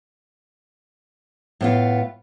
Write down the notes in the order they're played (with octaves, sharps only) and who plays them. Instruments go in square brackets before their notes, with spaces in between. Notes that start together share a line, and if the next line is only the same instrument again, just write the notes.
[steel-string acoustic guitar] A2 B3 F4